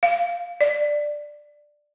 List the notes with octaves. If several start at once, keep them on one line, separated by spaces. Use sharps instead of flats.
F5
D5